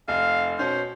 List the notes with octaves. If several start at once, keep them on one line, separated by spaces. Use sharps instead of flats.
F1 F5
B2 C#4 C5